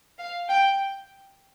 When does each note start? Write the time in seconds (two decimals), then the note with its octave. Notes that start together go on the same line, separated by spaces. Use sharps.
0.19 F5
0.49 G5